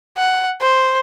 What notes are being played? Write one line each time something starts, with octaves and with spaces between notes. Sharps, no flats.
F#5
C5